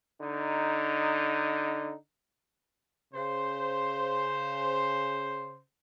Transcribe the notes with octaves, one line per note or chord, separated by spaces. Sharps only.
D3 D#4
C#3 C5